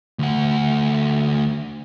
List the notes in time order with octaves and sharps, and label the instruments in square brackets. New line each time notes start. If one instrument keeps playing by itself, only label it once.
[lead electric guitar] D2 F#5